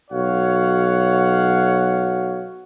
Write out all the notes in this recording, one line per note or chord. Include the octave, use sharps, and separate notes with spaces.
B1 F#4 C#5 F5 F#5